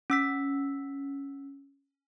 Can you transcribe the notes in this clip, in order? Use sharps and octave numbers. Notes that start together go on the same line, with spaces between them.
C#4 E6 B6